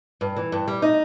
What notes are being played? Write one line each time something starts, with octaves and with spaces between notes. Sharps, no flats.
G2
E3
G2
G3
D#4